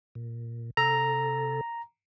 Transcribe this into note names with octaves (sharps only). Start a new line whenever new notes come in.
A#2
C3 A4 A#5